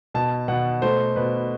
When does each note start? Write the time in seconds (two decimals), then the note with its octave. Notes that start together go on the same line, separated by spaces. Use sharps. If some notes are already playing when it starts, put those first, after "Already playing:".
0.14 B2 A5
0.48 B2 F#5
0.82 A3 C5
1.16 B2 B4